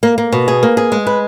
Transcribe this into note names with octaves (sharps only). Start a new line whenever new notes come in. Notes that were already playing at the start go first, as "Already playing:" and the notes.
A#3
A#3
B2
G#4
A#3
G#4
G#3
B4